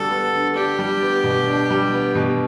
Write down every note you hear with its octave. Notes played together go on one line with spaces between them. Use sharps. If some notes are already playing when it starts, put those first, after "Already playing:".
Already playing: D3 G3 B3 F#4 A4
B3
D3
D4 G4
G3
B3
B2
D4
G3
B3
B2